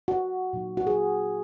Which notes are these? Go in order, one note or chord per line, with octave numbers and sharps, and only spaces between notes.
F#4
A#2 F#3 D#4
F#4
G#4